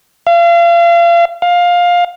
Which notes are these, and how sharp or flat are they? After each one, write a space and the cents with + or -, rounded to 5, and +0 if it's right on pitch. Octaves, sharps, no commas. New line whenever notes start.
F5 -35
F5 +15